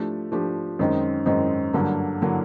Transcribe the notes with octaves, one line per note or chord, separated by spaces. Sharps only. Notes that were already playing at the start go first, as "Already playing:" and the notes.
Already playing: F3 A3 D4 G4
F3 A3 D4 G4
F#2 D#3 G#3 C4 D#4
F#2 D#3 G#3 C4 D#4
G2 D3 F#3 A#3
D3 F#3 A#3